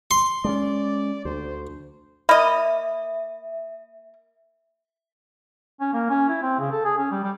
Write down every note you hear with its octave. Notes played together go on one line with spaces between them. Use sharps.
C6
G#3 B3 C#4 D5
D2 C5
A#3 D#5 E5 B5
C#4
A#3
C#4
E4
C4
C#3
A4
G#4
C#4
G3
G3